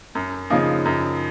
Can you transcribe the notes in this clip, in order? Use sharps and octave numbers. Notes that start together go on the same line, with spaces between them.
F#2
C#3 F3 A#3 D#4
F#2